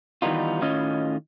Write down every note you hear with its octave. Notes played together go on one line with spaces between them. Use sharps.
D#3 E3 G3 B3 D#4 F4
A2 D#3 C#4 F4 D#5